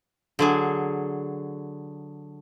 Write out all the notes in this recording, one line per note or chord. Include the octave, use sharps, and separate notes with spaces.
D3 F#3 G#4